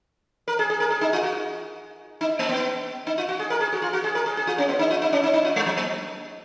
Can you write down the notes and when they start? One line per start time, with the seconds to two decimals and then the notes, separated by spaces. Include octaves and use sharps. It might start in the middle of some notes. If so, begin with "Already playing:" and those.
0.48 A#4
0.59 G#4
0.70 G#4
0.80 A#4
0.90 G#4
1.01 D#4
1.13 F4
1.23 F#4
2.21 D#4
2.39 A#3
2.49 B3
3.07 D#4
3.18 F4
3.29 F#4
3.40 G#4
3.50 A#4
3.61 G#4
3.72 F#4
3.82 F4
3.93 F#4
4.04 G#4
4.15 A#4
4.26 G#4
4.37 G#4
4.47 F4
4.58 C#4
4.69 B3
4.79 D#4
4.91 F4
5.02 D#4
5.12 C#4
5.23 D#4
5.34 D#4
5.45 F4
5.56 G#3
5.66 F#3
5.77 A#3